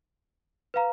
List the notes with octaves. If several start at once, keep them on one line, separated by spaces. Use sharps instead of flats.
B4 F5 A#5